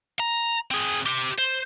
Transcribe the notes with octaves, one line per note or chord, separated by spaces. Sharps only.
A#5
C4 G#4
G4 C5
C5